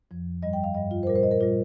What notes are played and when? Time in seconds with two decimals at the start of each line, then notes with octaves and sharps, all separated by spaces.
0.11 F2 F3
0.43 G2 G3 D#5
0.53 G5
0.64 F5
0.74 G2 G3 D#5
0.91 F4
1.03 C5
1.07 A#2 G3 A#4
1.16 C5
1.23 D#5
1.31 A#4
1.40 A#2 G3 F4